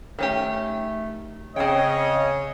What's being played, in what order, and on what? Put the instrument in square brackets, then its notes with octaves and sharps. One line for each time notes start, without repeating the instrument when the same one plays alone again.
[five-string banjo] D#3 C#4 G4 [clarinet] A3
[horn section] C#3 [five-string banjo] C4 G5 [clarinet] C#5 [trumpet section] D#5